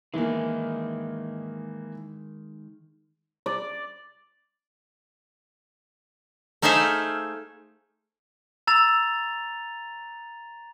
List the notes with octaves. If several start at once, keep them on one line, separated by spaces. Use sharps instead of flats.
D#3 E3 G#3 A#3
D5
A3 D#4 G#4 C5 E5 F5
A#5 E6 A6 F7